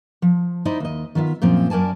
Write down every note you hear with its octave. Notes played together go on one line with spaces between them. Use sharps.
F3
D#4 E4 C5 D5 D#5
D#2 D#5
D#3 B3 F4 E5
F#2 A#2 F3 C4
F#2 A#4 D5 G#5 A5